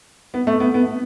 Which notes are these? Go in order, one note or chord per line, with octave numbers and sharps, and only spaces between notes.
B3
A3
B3
B3